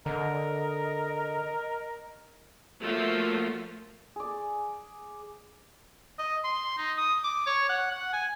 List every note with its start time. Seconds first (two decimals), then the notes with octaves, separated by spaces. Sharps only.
0.06 D3 A#4 D#5
2.81 F3 F#3 A3 A#3 F4
4.16 G#4 D5
6.18 D#5
6.44 C6
6.77 D#4
6.97 D#6
7.24 D6
7.46 C#5
7.69 F#5
7.91 F#5
8.13 G#5